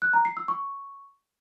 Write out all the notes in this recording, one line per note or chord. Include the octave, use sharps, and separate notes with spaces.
F#6
A#5
C7
E6
C#6